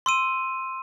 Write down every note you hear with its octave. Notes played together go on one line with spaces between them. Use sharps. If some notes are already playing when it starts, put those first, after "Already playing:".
C6 E6 D#7